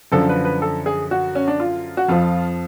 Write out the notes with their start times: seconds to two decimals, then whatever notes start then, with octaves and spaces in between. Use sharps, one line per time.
0.12 F#2 D3 F3 A4
0.29 B4
0.45 B4
0.62 A4
0.86 G#4
1.11 F#4
1.35 C#4
1.48 D4
1.60 F4
1.97 F#4
2.08 F2 F3 F4